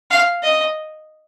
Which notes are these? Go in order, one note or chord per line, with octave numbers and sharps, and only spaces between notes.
F5
D#5